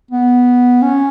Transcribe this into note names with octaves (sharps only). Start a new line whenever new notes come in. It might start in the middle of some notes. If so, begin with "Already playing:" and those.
B3
C#4